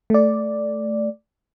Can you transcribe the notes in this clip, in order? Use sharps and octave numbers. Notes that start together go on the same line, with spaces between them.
A3 D5